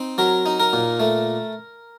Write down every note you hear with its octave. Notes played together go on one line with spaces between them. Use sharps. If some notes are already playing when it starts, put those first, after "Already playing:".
Already playing: C4 D#4
F#3 A#4
D#4
A#4
A#2
A3